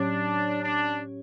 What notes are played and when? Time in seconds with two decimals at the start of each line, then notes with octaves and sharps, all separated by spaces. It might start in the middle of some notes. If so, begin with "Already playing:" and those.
Already playing: A2 F#3 C#4 D4 G4 C#5
0.62 D4